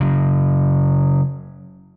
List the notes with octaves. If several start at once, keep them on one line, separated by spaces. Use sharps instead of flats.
C#3 F#3